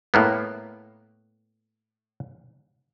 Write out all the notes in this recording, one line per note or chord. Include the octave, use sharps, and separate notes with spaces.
A2 A#3 B3